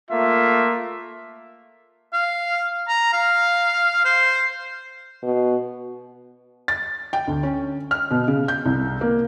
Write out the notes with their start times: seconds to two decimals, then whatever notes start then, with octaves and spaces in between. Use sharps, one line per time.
0.11 A3 A#3 F4 E5
2.13 F5
2.88 A#5
3.13 F5
4.05 C5
5.23 B2
6.68 A6
7.13 G5
7.27 D2
7.43 C#4
7.91 F6
8.11 B2
8.28 C#3
8.48 G6
8.65 C2
9.01 A#3